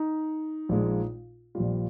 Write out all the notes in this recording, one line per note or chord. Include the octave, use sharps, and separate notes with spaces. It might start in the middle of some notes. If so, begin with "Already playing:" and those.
Already playing: D#4
A#1 A#2 G#3
A#1 A#2 G3 F4